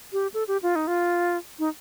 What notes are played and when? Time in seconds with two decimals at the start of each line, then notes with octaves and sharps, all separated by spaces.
0.13 G4
0.34 A4
0.48 G4
0.63 F4
0.76 D#4
0.87 F4
1.59 D#4